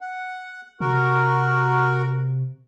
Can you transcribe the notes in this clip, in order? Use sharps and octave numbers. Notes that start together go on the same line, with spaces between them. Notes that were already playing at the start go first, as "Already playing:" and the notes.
F#5
C3 F#4 A#4